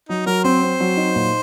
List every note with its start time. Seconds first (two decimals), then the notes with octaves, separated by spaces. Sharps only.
0.09 F#3 D#4
0.26 F#3 A#4
0.44 C4 C5
0.63 C4
0.80 F#3
0.97 D#4
1.15 A#2